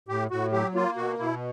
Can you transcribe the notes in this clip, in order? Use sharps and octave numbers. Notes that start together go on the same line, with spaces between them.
A2 G4
A2 F#4
F#3 G4
A#3 F4
B2 F#4
B2 E4